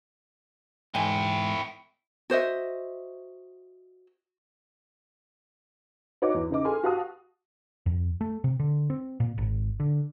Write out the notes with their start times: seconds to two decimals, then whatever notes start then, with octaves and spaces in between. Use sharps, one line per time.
0.95 G#2 E3 E4 G5 G#5
2.30 F#4 C5 D#5 E5
6.22 D#4 F#4 C#5 D6
6.34 E2
6.50 C#3 D#4 D6
6.65 G#4 A4 G#5 C6 F6
6.83 F#4 G4 F5 F#5 A5 D#6
7.86 F2
8.21 A3
8.44 C3
8.60 D3
8.90 C4
9.20 A#2
9.38 G#1
9.80 D3